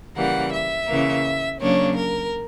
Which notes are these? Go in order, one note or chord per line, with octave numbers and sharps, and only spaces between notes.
C#3 E3 G3 A#3 F#5
E5
C#3 E3 A#3
C#3 F#3 A#3 D4 C#5
A#4